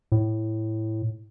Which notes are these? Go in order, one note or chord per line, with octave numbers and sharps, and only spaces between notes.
A2